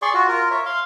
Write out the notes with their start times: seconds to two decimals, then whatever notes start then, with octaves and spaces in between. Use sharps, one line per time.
0.02 G#4 D5 C6 C#6
0.14 F4 F#4
0.28 F4 A#4
0.51 C#5 E5
0.66 F5 C6